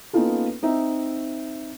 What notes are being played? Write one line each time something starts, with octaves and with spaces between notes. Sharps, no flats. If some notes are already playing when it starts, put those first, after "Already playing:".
A#3 B3 C#4 D#4 F4 A4
C4 D#4 E5